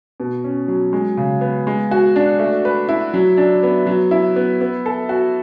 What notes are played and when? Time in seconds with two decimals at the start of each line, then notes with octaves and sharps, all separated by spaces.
0.20 B2
0.44 C#4
0.68 F#3
0.93 G#3
1.17 C#3
1.41 B3
1.67 G#3
1.91 F#4
2.16 D4
2.39 A3
2.65 B4
2.89 E4
3.14 F#3
3.37 D4
3.63 B3
3.87 F#3
4.11 E4
4.36 B3
4.61 B3
4.86 A4
5.09 F#4